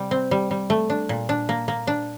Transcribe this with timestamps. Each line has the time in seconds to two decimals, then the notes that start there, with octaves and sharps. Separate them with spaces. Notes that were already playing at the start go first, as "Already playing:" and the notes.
Already playing: C3 G3
0.11 C4
0.31 G3
0.51 G3
0.70 A3
0.90 D4
1.09 A#2
1.29 D4
1.49 A#3
1.68 A#3
1.87 D4